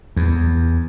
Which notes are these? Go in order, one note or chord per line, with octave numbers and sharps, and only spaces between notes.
E2